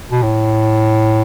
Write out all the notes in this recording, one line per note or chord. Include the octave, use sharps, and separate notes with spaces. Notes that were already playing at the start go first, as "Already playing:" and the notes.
B2
A2